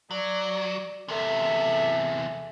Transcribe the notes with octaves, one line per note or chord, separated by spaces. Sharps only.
F#3 D5
E2 C3 A4 E5